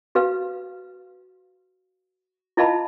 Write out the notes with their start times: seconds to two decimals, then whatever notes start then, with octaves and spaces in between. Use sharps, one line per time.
0.15 F#4 B4 F5
2.57 E4 F4 D#5 F5 A5 B5